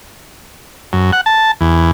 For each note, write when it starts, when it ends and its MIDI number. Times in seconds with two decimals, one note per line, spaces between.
0.93 1.11 42
1.13 1.21 78
1.26 1.52 81
1.61 1.91 40